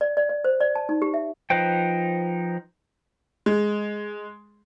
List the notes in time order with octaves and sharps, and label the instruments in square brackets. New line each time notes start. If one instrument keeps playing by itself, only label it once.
[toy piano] D5
D5
D5
C5
D5
A5
D#4
G4
E5
[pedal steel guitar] F3 D#4 B4 C5 G5
[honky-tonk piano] G#3